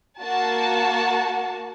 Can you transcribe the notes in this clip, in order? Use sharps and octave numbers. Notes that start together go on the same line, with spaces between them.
A#3 F#4 A5